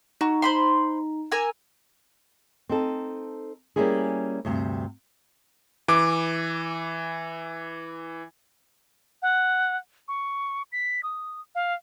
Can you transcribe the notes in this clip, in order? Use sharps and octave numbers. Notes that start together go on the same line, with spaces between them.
D#4 F#4 A#5
C5 B5 C6
A#4 G#5 E6
C4 D#4 A4
G3 A#3 C#4 E4 F#4 G#4
D2 G2 C3
E3 D6
F#5
C#6
B6
D#6
F5